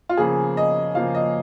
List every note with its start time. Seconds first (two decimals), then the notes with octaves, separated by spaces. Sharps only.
0.09 F4
0.17 C#3 F3 A#3 G#4
0.57 D#5
0.95 C#3 F3 A#3 F5
1.15 D#5